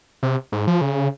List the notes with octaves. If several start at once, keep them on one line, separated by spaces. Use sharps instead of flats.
C3
G#2
F3
C#3